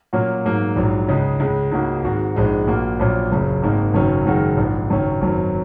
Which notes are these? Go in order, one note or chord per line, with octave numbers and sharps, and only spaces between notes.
A#2 F#3 A#3 C#4 F#4
G#2 F#3 A#3
A#1 G#2 F#3
C#2 C#3 G#3 D#4
C#2 C#3 G#3
C#2 C#3 A#3 D#4 F#4
G#1 G#2 G#3 F#4
A#1 G#2 G#3 D#4
A#1 A#2 A#3 F#4
A#1 A#2 F#3 C#4
F#1 F#2 C#3
G#1 G#2 D#3 A#3 D#4
F#1 F#2 D#3 F#3 C#4
F#1 F#2 D#3 G#3 F#4
A#1 G#2 D#3
F#1 F#2 D#3 F#3 C#4
G#1 F#2 F#3